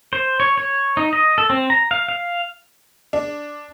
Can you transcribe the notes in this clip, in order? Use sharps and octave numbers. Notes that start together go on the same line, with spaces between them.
C5
C#5
C#5
D#4
D#5
A4
C4
A#5
F5
F5
D4